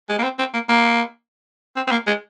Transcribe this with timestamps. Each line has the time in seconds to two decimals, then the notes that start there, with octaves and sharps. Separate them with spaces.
0.09 G#3
0.19 A#3
0.23 C4
0.39 C4
0.54 A#3
0.69 A#3
1.76 C4
1.87 C4
1.92 A#3
2.07 G#3